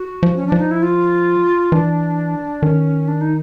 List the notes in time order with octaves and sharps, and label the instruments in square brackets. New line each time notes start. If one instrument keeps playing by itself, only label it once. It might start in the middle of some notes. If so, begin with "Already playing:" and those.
Already playing: [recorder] F#4
[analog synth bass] F3
[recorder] C#4
[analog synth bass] F3 [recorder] D4
[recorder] D#4
E4
F4
[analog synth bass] E3 [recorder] D4
[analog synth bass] D#3 [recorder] C#4
[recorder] D4
D#4